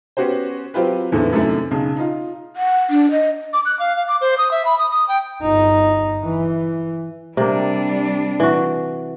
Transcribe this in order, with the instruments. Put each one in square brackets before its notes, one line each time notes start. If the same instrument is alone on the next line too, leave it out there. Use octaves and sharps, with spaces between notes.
[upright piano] B3 C#4 F#4 G4 C5
F#3 C4 F4 G4 B4
E2 A2 D3 A3 B3
F#2 C3 D#3 A3 E4
B1 C#3
D#4 F4
[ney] F#5
D4
D#5
[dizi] D6
F#6
F5
F5
D6
C5
D#6
E5
B5
D#6
D#6
G5
[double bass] G1 D#4
E3
[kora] C3 A#3 [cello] G3 D4
[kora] E3 F#4